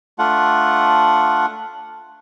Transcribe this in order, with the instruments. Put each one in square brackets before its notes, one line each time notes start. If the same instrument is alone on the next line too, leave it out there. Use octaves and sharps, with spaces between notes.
[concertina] A3 D4 F4 F#5